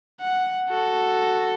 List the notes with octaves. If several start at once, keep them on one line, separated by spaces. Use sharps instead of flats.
F#5
F#4 A4